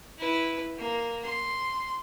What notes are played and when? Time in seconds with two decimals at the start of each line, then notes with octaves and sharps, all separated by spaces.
0.18 E4 B4
0.78 A#3
1.24 C6